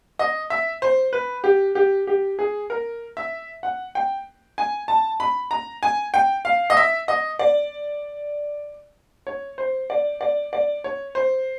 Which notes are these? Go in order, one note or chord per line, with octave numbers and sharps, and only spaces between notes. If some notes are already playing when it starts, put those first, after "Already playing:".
D#5
E5
C5
B4
G4
G4
G4
G#4
A#4
E5
F#5
G5
G#5
A5
B5
A#5
G#5
G5
F5
D#5
E5
D#5
D5
C#5
C5
D5
D5
D5
C#5
C5